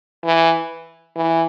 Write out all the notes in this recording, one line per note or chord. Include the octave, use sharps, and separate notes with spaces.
E3
E3